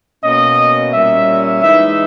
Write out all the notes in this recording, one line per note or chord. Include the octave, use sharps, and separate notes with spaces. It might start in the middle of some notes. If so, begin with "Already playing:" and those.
B2 A#3 C#4 D#5
A#2 G3 C#4 E5
E3 G#3 D#4 E5